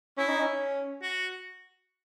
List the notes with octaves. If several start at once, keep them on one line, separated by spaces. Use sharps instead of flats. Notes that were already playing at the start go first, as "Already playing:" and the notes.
C#4 E4
D#4
C#4
F#4